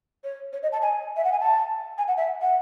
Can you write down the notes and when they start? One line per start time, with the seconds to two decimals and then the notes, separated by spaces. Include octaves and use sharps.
0.24 C#5
0.53 C#5
0.63 D#5
0.72 A5
0.82 G#5
1.16 E5
1.24 F#5
1.32 G#5
1.40 A5
1.98 G#5
2.08 F#5
2.17 E5
2.41 F#5